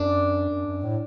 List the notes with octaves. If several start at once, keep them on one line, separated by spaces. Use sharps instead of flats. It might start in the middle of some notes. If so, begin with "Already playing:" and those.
Already playing: F#2 D4
F#2
F#2
A2